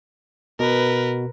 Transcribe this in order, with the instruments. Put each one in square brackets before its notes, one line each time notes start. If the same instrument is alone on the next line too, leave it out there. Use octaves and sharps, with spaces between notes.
[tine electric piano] B2 [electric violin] A#4 B4